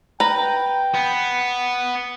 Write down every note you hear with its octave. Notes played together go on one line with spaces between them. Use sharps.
B4 G5 A#5
B3